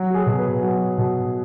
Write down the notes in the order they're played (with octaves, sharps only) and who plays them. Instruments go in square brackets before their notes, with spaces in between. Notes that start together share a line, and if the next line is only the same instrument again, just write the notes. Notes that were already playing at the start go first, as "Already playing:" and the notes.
Already playing: [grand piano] F#3
F#4
G#4
B2
B4
F#3
B2